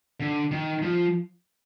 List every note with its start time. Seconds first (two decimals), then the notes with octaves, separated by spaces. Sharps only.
0.20 D3
0.51 D#3
0.82 F3